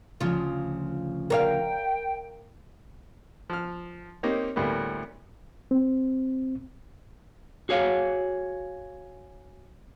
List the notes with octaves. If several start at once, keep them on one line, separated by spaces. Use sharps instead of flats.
D2 C#3 F3 F4
A#4 C#5 F5 G5
F3 F6
A#3 C4 D#4 G4 C#5
D2 A2 G3 A#3 B3
C4
F#4 G#4 C#5 F5